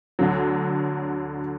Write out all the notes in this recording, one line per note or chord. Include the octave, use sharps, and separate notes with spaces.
D2 D3 F#3